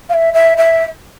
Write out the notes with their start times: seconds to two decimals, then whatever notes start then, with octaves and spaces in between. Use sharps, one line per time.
0.09 F5
0.14 E5
0.34 E5
0.57 E5